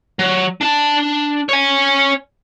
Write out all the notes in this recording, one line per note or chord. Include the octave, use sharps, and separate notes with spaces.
F#3
D4 A5
C#5 G#5